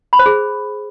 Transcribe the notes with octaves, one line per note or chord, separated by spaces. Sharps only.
B5
C5
G#4